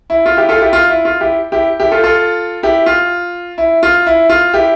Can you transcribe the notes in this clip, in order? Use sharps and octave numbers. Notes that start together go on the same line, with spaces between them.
E4
F4
E4 G4
F4 A4
E4 G4
F4
E4
F4
E4 G4
E4 G4
E4 G4
F4 A4
F4 A4
E4 G4
F4
E4
F4
E4
F4
E4 G4